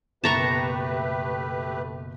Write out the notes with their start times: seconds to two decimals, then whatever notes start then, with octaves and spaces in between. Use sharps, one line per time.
0.24 F#1 B2 A3 G4 B4 A5 A#5 C#6